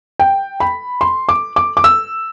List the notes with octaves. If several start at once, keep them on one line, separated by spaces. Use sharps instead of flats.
G5
B5
C6
D6
D6
D6
E6